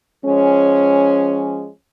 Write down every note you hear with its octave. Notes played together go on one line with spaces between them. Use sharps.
F3 G#3 C#4